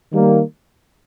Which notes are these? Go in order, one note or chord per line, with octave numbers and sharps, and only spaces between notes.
D#3 G3 A#3